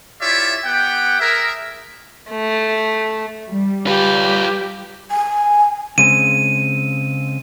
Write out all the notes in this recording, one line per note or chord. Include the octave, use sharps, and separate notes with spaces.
E4 F4 G4 C#5 D5 E5
B3 G4 F#5 G5
G#4 A#4 E5
A3
G3
F4 G4 B4
G#5
C#3 G#3 C4 D#7